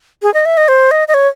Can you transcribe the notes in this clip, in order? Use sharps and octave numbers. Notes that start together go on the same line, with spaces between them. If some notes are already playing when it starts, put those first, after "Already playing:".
G#4
D#5
E5
D#5
C5
D#5
D#5
C#5